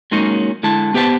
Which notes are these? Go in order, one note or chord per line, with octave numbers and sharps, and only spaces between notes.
F#3 G#3 A#3 C#4 D#4
D3 G#3 E4 A5
B3 G4 B4 C5 A5